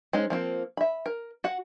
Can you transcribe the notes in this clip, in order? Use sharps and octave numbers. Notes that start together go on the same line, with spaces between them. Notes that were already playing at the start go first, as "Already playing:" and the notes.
G#3 C#4 D#4 C5
F3 A#3 C4
E5 B5
A#4
F#4 F#5